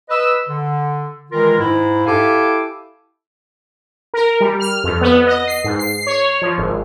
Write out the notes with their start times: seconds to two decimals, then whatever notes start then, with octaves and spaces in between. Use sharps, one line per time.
0.09 B4 D#5 E6
0.49 D3
1.32 D#3 E3 G#3 F4 A#4
1.59 G#2 E4
2.06 E4 G4 A4 F5 G#5 D6
4.14 A#4
4.41 G3
4.60 F6
4.84 F2
5.01 B3
5.27 D#5
5.48 C7
5.64 G#2
5.79 C7
6.07 C#5
6.42 F3
6.58 G#1